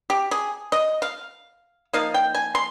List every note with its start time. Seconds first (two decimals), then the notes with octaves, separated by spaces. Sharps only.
0.10 G4
0.31 G#4
0.72 D#5
1.02 F5
1.93 F3 A#3 D#4 F5
2.14 G5
2.35 G#5
2.55 C6